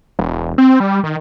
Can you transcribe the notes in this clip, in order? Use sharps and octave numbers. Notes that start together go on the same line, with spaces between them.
E1
C4
G3
D#3